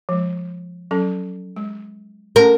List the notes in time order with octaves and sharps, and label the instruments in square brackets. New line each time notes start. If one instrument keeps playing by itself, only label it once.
[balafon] F3 G#3
F#3 C#4 A4
G#3
[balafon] A3 C#4 A4 [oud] A#4